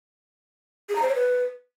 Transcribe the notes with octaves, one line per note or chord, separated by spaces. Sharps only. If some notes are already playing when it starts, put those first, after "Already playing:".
G#4
A#5
C5
C#5
B4